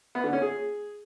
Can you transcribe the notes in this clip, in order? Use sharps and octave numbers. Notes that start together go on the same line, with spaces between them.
B3
D3
C#4
G#4